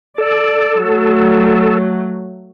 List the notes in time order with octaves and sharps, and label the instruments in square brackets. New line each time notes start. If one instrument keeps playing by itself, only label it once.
[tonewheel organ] A4 [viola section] D5
[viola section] F#3 A3